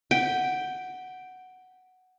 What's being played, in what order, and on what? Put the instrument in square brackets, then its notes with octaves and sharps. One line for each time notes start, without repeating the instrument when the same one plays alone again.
[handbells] F#5 [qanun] G5